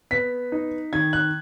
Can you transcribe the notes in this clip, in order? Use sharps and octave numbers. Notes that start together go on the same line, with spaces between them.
B3 B6
D#4
D#3 G#6
F#6